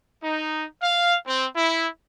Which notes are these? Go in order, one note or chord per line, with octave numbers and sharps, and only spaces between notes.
D#4
F5
C4
E4